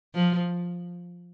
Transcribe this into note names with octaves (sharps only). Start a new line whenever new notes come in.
F3